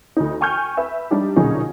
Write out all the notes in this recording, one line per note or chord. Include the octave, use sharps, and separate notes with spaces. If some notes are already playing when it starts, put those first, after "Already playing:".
D2 D#4
G5 G#5 C#6 F6 G6
B4 E5
G3 D4 D#4 G4
B1 A#2 D3 C#4 D#4 G#4